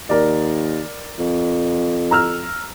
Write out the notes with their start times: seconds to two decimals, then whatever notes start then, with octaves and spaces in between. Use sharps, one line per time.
0.09 D#2 A#4 D5
1.19 F2
2.11 A#5 E6 F6